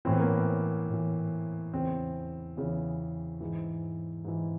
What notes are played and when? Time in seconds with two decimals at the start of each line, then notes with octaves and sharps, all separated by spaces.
0.05 A2 E3 C4
0.12 B3
0.20 A#3
0.27 B3
0.89 A2 E3
1.73 E2 C#3 E3 C4
2.57 E2 C#3 E3
3.41 G#2 E3
4.25 G#2 E3